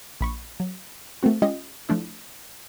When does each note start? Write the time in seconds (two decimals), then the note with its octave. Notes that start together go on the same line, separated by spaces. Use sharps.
0.21 A#1 B5 C#6
0.60 F#3
1.23 A3 A#3 C4 F#4
1.42 G#3 C#4 F4 G4 D#5
1.89 F3 A3 D4 E4